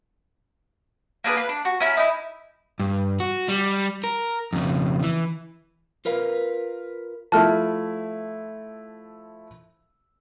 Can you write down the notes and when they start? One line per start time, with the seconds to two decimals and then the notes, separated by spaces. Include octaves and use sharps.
1.24 A#3 D4 G#4 B4
1.37 F4 B4
1.49 D4
1.65 F#4
1.80 C#4 E4 A#4
1.97 D#4 E4
2.80 G2
3.20 F#4
3.48 G3
4.04 A#4
4.53 F2 C#3
5.03 E3
6.05 F4 A#4 B4 F5
7.32 F3 A3 E4 A5 F6